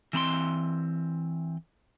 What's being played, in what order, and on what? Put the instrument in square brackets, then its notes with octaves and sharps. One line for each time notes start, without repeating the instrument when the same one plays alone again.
[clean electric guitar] E3 C4 B5 C6